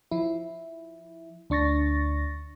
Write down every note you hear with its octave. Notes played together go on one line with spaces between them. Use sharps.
F3 E4
D2 D4 C#6 A6 A#6